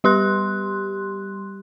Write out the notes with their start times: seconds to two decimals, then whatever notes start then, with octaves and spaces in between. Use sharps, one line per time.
0.04 G3 G4 C6 F#6